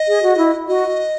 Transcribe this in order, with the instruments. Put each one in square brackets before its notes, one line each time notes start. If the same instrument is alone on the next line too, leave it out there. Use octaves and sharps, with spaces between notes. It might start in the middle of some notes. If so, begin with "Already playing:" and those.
Already playing: [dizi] D#5
[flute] G#4
F#4
E4
[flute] F#4 [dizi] D#5